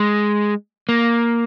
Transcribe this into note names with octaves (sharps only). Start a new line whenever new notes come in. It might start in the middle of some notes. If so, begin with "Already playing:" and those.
Already playing: G#3
A#3